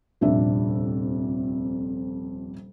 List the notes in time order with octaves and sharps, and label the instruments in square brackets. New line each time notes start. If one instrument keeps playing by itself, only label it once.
[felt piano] D#1 F2 C3 D4 E5